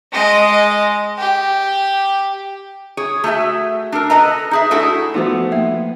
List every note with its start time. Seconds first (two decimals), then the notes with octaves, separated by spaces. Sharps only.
0.12 G#3 D#5
1.18 G4
2.97 G#4 C#5
3.24 A3 F#4 G#4 E5
3.92 D4 A4 A#4
4.10 A4 B4 D#5 A#5
4.51 D#4 G#4 E5
4.71 A3 D4 E4 F#4 G#4 A4
5.14 F3 A3 B3 D#4 F#4 C5
5.52 A#3 E5